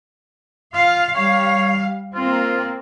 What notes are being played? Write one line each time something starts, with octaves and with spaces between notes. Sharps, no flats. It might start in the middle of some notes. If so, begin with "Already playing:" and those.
F4 F5
G3 C#5 F5
A#3 C4 F4